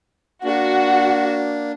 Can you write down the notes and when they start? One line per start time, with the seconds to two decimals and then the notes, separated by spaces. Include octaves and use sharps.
0.44 A#3 D4 F#4